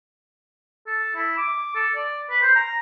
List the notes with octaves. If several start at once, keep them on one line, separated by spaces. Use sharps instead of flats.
A4
E4
D6
A4
D5
B4
C5
A#5